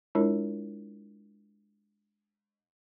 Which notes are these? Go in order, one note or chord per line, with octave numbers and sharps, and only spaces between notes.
G#3 D4 E4 F4 A#4 C#5